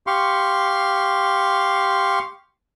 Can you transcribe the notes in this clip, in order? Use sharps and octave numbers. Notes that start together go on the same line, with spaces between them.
G4 F5 C6 C#6